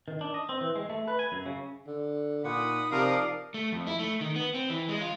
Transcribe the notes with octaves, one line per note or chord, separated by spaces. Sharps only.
D#3
D4
D#5
C4
E3
G#3
A3
B4
G#5
F#2
C#3
D3
A#2 D#4 F#5 B5 D#6
C3 F3 A#4 D5 F5
A3
F2
E4
A3
D#3
B3
C4
E3
G#3
F4